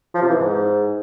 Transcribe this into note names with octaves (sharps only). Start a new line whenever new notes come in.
F3
C3
E3
G#2